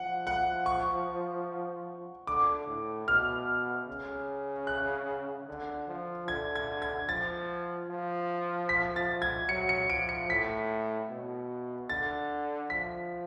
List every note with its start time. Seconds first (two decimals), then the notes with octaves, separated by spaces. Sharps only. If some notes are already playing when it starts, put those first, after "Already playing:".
Already playing: F3 F#5
0.27 F#5
0.66 C#6
2.27 D3 D6
2.68 A2
3.07 B2 F6
3.87 C#3
4.67 F#6
5.48 D3
5.88 F3
6.28 D3 G#6
6.55 G#6
6.82 G#6
7.08 F3 A6
7.89 F3
8.69 B6
8.96 A6
9.22 G#6
9.49 F#3 C#7
9.69 C#7
9.89 F3 D7
10.09 C#7
10.30 A2 B6
11.09 B2
11.89 D3 A6
12.69 F3 B6